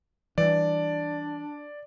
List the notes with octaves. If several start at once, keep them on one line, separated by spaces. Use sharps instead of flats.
E3 G3 D4 D5